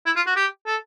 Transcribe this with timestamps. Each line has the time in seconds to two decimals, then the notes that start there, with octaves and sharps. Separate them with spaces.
0.06 E4
0.16 F4
0.27 F#4
0.36 G4
0.67 A4